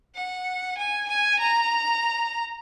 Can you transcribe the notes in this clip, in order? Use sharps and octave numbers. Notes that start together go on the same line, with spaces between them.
F#5
G#5
G#5
A#5